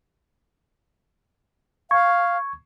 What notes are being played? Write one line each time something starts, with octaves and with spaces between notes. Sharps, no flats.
F5 C#6 G#6